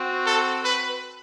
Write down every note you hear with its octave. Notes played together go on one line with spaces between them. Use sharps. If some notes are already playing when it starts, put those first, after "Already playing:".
Already playing: C4 F#4
A4
B4